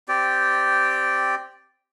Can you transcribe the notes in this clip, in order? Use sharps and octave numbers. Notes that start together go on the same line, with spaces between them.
C4 G4 D5 G5